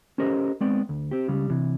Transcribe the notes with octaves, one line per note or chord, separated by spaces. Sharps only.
C#4 G4 A4 A#4 C5 D#5
G#3 B3 C4 D5 G5
D2
C4 G4
C#2 C#3 G3
C3 E3